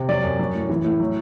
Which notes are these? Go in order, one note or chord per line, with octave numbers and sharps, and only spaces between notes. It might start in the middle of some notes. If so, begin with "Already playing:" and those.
Already playing: C3
F#3 D5
F#2
F#3
A2
E3
A2
F#3